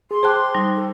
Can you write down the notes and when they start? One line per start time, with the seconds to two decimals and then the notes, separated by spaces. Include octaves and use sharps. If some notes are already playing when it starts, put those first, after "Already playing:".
0.11 G#4 C6
0.23 G#4 C5 G5 A5 D6 F#6
0.55 G3 D#4
0.75 A4